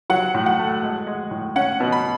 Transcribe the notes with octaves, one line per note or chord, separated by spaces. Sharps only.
F#3 F#5
A2
F#5
A3
G#3
G#3
A2
C#4 F#5
B2
B5